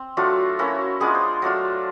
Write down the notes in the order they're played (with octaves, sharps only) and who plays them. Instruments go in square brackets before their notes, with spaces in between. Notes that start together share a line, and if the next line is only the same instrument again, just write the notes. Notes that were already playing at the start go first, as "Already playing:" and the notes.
Already playing: [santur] C4
F#3 A3 D4 F4 F#4
A#3 C#4 E4 F#4
G#3 B3 D4 F4 G#4
C5
F#3 A3 D4 F4